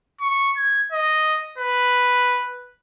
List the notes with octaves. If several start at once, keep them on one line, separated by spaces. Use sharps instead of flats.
C#6
G#6
D#5
B4